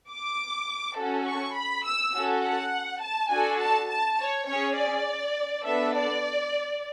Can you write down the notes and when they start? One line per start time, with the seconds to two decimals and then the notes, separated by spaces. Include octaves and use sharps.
0.09 D6
0.96 C#4 F#4 A4
1.25 C#6
1.55 B5
1.84 E6
2.13 C#4 F#4 A4
2.42 F#5
3.01 A5
3.30 D4 F#4 A4 G#5
3.59 A5
3.89 A5
4.18 C#5
4.47 C#4 G#4 C#5
4.77 D5
5.64 B3 D4 A4 E5
5.94 D5